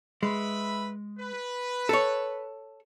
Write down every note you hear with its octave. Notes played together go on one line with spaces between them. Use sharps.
G#3 B4 E5 B5
B4
A4 C#5